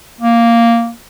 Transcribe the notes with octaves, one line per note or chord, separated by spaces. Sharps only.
A#3